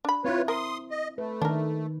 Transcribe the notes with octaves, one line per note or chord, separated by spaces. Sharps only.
D4 B5
C4 E4 F4 B4 C#5
A#4 C6 D#6
D#5
A3 B4
D#3 D4 A#4